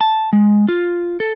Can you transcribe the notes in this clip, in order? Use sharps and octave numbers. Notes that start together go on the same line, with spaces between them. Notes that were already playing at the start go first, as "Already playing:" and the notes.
A5
G#3
F4
A4